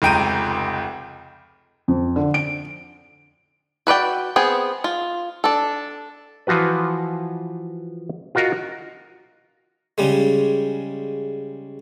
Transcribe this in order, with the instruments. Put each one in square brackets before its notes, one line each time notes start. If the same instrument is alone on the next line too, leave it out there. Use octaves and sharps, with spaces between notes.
[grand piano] F1 C#2 G5 A#5 D#7
[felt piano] F2
D3
D7
[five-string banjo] F#4 B4 D5 G5
B3 C4 G#4 G5
F4
D4 A4
[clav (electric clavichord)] E3 F3 F4 F#4 B4
F4 F#4 A#4 D#5
[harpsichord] C#3 G3 G#3